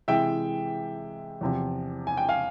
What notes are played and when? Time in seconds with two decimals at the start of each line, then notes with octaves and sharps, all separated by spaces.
0.08 C3 E3 G#3 E5 G5
1.41 E2 C3 F3
2.07 G#5
2.17 G5
2.28 F5 G#5